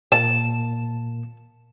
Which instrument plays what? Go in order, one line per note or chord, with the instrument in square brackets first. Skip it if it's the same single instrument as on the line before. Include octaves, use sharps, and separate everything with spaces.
[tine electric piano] A#2 A#3 [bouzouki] A5